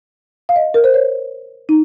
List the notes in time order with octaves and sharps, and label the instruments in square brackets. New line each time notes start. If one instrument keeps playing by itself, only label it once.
[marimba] F5
D#5
A#4
C5
C#5
D#4